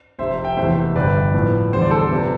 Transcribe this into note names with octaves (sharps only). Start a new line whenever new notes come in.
F1 F2 C3 C5 E5
E5 G5
F1 E2 C3 E3 A3 C5 E5
G1 F2 D3 B4 D5
A2 F3 B3
E2 D3 G3 C5
D5
A4 C5
C3 F3 B3